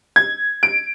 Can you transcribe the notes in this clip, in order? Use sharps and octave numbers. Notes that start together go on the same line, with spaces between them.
G#6
D7